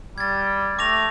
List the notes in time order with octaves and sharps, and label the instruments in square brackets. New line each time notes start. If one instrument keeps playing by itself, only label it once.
[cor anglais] G3 [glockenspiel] G#6 A6
[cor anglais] A3 [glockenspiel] D6 A#6 F7